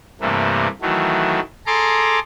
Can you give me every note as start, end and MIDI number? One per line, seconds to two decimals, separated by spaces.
0.21 0.68 43
0.21 0.68 48
0.21 0.68 52
0.21 0.68 57
0.21 0.68 58
0.81 1.40 51
0.81 1.40 52
0.81 1.40 54
0.81 1.40 57
1.66 2.19 68
1.66 2.19 69
1.66 2.19 82
1.66 2.19 84
1.66 2.19 86